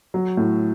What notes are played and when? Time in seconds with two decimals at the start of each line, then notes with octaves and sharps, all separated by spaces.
0.14 F#3
0.37 A2